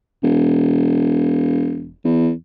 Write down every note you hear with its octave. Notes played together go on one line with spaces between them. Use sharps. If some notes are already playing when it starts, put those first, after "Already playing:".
E1
E2